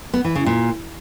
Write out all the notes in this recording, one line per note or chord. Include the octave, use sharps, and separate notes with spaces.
B3
E3
C#3
A#2